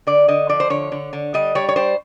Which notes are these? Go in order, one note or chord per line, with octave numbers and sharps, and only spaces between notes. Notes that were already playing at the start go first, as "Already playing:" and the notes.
D3 D5
D3 D#5
F3 D5
C5
D3 C#5
D3
D3
G3 D#5
G3 C#5
C#5
G3 C5